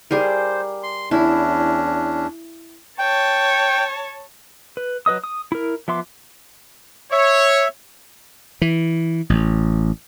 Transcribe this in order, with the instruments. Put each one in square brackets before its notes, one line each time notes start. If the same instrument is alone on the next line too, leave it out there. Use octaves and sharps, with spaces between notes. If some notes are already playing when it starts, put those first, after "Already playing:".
[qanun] G3 G#4 A#4 [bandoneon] C5
[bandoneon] C6
[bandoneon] E2 C#4 D4 [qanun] E4
[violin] C#5 A5 [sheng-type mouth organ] G5
[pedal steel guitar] B4
F#3 B4 D#5 D#6
D#6
E4 A#4
F3 B3 E5 C6 D6
[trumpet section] C#5 [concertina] E5
[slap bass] E3
A1